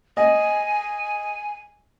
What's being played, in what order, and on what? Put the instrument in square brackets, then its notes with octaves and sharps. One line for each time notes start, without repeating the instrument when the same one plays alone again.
[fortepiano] D#5 [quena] G#5